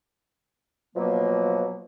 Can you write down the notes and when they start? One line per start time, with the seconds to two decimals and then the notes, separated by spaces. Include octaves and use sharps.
0.95 B2 F3 F#3 A#3